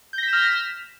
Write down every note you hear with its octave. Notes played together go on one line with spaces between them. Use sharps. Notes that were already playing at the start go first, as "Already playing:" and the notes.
F6 G6 A#6 B6 E7